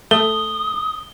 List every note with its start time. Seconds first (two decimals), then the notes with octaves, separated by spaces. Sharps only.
0.11 A3 D#6 G7